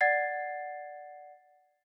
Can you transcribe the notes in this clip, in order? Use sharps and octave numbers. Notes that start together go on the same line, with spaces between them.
D5 F#5 G#6 A6 C7